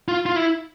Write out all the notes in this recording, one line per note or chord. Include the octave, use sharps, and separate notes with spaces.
F4
F4
E4